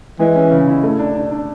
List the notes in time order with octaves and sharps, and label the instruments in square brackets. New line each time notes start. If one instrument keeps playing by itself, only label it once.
[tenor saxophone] E3 [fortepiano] G#3
[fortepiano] C#4
C#3
E4
A3
D4
D4
D4